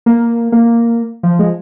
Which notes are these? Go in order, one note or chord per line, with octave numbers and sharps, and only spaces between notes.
A#3
A#3
F3
G#3